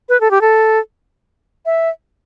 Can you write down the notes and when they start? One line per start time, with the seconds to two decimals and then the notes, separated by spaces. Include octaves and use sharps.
0.09 B4
0.21 A4
0.31 G4
0.41 A4
1.66 E5